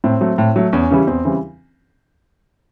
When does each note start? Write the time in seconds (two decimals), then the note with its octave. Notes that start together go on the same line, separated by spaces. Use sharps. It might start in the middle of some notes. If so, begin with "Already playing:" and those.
0.04 A2 C4
0.21 F#3 A3
0.38 A2
0.56 F#3 A3
0.73 E2 C#4
0.91 C#3 E3 G3
1.07 E2 C4
1.25 C#3 E3 G3